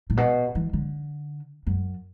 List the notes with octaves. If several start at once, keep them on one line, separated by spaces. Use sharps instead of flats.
A2
B2
E3
D3
F#2